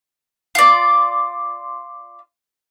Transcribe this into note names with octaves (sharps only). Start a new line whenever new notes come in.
F4 D5